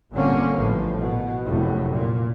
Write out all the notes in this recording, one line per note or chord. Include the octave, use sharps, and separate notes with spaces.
G1 A#2 D3 A#3 C4 C#4
A1 F3
B2
F1 F#2 A2
A#2